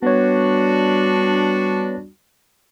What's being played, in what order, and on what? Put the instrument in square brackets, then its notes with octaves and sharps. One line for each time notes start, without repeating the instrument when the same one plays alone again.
[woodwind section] G3 D4 F#4 [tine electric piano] B3 B4 C#5